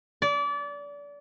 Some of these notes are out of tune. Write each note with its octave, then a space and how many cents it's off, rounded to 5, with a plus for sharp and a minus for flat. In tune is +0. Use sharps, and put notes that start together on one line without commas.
D5 -30